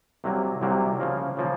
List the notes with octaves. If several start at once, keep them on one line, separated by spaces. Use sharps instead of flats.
C2 C3 F#3 A#3
C2 C3 F#3 A#3
C#3 F3 A#3
C#3 F3 A#3